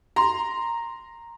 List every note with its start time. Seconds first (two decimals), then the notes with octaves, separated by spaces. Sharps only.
0.16 A#5 C6